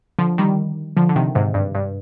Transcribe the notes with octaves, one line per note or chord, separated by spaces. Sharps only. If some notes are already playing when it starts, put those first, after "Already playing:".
D3 F3
D#3 G3
D3 F3
D3
C3 D#3
G#2 C3
G2
G2